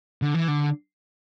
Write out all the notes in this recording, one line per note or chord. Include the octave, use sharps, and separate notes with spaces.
D3
E3
D3